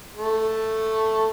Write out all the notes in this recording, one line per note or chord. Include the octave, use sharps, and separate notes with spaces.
A3